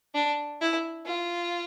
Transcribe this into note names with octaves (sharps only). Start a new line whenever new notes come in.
D4
E4
F4